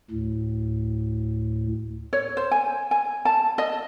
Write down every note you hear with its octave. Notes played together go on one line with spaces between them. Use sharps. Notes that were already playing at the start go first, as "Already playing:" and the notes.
D2 A2
C#5
C5
G#5
G#5
A5
D#5